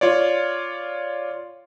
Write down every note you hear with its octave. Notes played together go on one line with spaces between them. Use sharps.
F4 C#5 D5